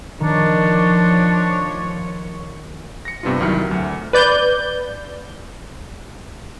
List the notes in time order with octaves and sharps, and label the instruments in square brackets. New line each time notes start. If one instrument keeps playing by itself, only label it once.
[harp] D#3 [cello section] F3 C#5 [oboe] D4
[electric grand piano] A#6 C#7
G2 C3 B3 D4 F4
C2 D#3 F#3 E4 F6 C#7
F#3
D2
[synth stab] B4 D5 G6